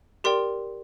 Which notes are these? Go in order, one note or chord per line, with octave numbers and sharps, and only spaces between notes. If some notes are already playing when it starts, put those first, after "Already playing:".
G4 A#4 D5 G5 C6